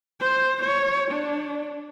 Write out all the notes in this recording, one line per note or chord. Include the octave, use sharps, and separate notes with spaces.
C5
C#5
D4